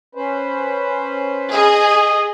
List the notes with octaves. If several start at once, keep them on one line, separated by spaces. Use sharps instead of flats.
C#4 B4 C5
G#4 D#5